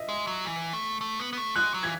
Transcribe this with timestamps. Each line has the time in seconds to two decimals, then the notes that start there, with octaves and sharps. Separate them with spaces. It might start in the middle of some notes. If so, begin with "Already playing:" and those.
Already playing: D#5 E5
0.09 G#3
0.27 F#3
0.45 E3
0.73 A3
1.01 A3
1.19 B3
1.33 B3
1.37 A3
1.56 G#3 F#6
1.74 F#3
1.83 E3 G#6